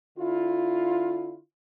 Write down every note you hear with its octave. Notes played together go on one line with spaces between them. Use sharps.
D3 E4 F4